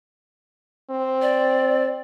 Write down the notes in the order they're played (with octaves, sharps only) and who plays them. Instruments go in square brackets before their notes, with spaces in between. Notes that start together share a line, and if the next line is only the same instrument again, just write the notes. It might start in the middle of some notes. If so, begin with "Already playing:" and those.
[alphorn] C4
[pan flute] D5